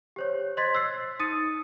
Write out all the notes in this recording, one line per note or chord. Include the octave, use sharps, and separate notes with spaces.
G4 C5 C#5
C5 D#5 C6 G#6 A6 B6
E6 F#6 C7
D#4 D#6 A6 C#7 D#7